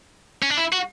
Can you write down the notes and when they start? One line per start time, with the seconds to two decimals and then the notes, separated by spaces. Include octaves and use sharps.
0.42 C#4
0.50 D4
0.58 E4
0.73 F#4